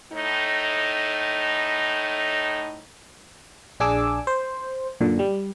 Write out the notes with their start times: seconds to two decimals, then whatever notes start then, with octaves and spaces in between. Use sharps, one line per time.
0.12 A2 D#4
3.80 A#1 D4 G#4 G#5 D6 E6
4.27 C5
5.01 F#2 A#2 D3
5.19 G3